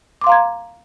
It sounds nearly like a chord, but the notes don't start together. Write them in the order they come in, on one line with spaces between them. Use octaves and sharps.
D6 C6 F5 A#5 G#6